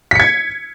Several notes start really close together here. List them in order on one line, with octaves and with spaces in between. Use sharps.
B6 C#7 G#6